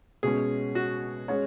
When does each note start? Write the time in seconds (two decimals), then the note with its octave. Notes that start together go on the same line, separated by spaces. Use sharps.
0.23 B2 G#3 C#4 G#4
0.75 F#4
1.28 G#3 C#4 G#4 C#5